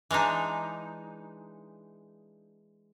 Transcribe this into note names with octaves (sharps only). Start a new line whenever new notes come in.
E3 G#3 D4 D#4